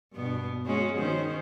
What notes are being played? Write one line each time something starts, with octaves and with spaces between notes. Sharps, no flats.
G2 B2 B3
G#3 C#4 F#4
D#3 C#4 C5